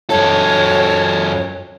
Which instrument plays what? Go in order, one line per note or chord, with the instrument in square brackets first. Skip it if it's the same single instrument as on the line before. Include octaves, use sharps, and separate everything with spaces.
[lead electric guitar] F#2 A4 [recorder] C#5